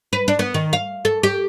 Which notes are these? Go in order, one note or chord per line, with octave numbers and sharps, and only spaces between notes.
B4
D4
B3
D#3
F5
A4
G4